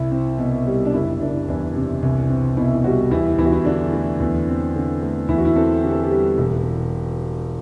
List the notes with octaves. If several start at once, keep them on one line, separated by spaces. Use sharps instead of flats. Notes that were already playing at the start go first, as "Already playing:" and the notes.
Already playing: C2 E4
C4
B2
G3
D4
F#1 E4
F#1 D4
E2 D4
C3
C2
C4
B2 E4
G3 F#4
E2 E4
E2 E4
F#4
E4
D3 D4
A3
E2
C4
D3
A3
E2 E4
F#4
E4
C4 A4
D3 G4
A4
G4
G3
E1